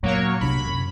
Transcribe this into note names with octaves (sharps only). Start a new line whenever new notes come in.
F#2 A#2 F#3 A#3 C#5
C2 D4 B5
F#2